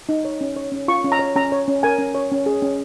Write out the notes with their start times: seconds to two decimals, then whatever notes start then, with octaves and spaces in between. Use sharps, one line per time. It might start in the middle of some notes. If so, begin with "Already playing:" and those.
0.09 D#4
0.25 C#5
0.41 C#4
0.56 C#5
0.72 C#4
0.88 F4 C#6
1.04 C#4
1.12 A#5
1.19 C#5
1.36 C#4 A#5
1.52 C#5
1.68 C#4
1.83 A#4 G#5
1.99 C#4
2.15 C#5
2.32 C#4
2.46 G#4
2.62 C#4